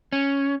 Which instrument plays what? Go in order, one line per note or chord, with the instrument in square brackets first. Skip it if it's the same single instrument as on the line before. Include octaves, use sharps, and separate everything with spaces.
[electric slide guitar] C#4